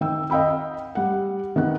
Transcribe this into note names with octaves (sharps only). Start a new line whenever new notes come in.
D#3 G5 E6
D#5 F5 G5 B5 E6
G3 F#5
D#3 B3 F#5 F#6